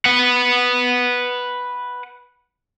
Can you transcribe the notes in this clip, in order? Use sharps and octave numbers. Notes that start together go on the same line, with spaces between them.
B4 F#5